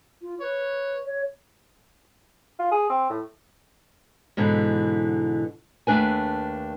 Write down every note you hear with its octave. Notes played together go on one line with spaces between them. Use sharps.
F4
B4 C#5
C#5
F4
G#4
C4
A2
G#2 B2 D3 E3
D#2 A3 D4 B4 G#5